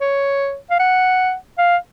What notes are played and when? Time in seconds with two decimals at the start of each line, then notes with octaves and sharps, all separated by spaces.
0.01 C#5
0.70 F5
0.80 F#5
1.58 F5